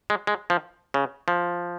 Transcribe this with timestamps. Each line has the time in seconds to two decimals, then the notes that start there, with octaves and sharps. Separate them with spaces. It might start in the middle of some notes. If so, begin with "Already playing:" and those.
0.10 G#3
0.27 G#3
0.50 F3
0.94 C#3
1.28 F3